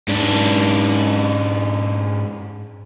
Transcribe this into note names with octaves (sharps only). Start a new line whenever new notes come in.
G#2 D4